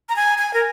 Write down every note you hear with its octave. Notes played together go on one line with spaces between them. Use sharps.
A#5
G#5
G#5
A#4